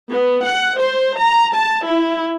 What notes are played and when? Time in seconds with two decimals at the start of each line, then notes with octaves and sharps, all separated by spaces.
0.11 B3
0.45 F#5
0.79 C5
1.18 A#5
1.53 A5
1.86 E4